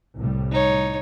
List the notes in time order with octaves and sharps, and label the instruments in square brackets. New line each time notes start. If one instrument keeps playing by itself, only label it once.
[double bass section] C2 A2 G3
[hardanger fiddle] D#4 C#5